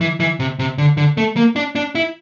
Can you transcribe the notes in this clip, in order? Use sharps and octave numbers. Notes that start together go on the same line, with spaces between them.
E3
E3
C3
C3
D3
D3
A3
A#3
D4
D4
E4